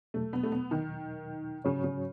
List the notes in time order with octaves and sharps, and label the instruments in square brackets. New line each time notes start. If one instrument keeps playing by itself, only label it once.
[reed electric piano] E2 B2 F#3 [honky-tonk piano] A3
[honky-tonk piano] B3
A3
B3
D#3
[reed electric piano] G#2 F#3 C#4 F#4 C#5 [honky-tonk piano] C#3
[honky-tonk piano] C#3